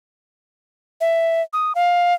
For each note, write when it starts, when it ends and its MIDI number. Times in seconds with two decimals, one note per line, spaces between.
1.01 1.42 76
1.53 1.73 87
1.75 2.14 77